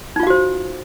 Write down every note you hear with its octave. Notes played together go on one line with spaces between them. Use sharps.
D#4 F4 F#4 C5 F5